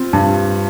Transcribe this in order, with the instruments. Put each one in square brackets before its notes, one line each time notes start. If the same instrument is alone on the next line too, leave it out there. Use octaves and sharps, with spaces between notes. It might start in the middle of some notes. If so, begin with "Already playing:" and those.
Already playing: [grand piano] C4 F4
G2